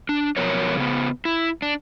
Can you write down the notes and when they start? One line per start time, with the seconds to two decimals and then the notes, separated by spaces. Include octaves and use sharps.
0.09 D4
0.37 B2 F3 F#3 B3 A#4 C#5
0.77 C#3 B3
1.25 E4
1.62 D4